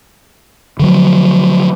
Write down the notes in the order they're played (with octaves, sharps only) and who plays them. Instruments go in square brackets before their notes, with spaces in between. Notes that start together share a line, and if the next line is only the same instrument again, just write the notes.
[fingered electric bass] D3 F3 F#3